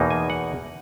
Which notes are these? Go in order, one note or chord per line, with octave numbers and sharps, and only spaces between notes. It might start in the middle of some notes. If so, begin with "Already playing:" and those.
Already playing: E2 B2 A#3 D#4
G#5
F#5